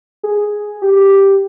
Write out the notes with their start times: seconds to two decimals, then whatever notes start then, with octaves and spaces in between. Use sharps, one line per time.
0.23 G#4
0.82 G4